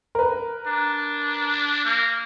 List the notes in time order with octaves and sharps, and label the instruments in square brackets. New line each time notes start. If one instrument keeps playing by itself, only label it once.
[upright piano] A#4 B4
[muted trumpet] D4
A#3